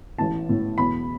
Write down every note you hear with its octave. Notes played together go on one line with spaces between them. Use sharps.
A1 A2 E3 A5
A1 A2 E3
E2 B2 B5